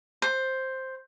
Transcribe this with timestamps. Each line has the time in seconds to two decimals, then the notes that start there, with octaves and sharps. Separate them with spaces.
0.22 C5